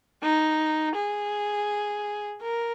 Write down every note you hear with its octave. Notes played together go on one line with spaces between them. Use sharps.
D#4
G#4
A#4